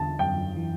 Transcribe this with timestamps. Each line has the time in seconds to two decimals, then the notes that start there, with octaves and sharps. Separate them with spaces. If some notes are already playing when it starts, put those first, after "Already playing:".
Already playing: E2 D3 A5
0.19 F#2 G5
0.56 E3